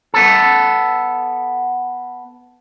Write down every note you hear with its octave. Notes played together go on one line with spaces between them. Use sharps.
B3 A4